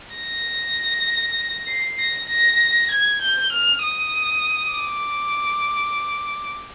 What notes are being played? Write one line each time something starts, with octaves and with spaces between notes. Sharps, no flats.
A#6
C7
A#6
A#6
G#6
G6
F6
D#6
D6